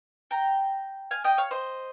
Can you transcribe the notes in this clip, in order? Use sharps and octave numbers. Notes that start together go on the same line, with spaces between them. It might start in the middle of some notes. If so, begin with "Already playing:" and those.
G5 A#5
F5 G#5
D#5 G5
C#5 F5
C5 D#5